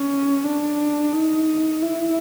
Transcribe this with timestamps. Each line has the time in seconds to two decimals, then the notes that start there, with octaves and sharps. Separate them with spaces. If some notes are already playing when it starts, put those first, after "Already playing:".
Already playing: C#4
0.44 D4
1.13 D#4
1.82 E4